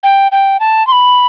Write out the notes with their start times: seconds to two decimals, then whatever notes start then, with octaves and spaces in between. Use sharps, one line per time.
0.03 G5
0.32 G5
0.60 A5
0.87 C6
0.92 B5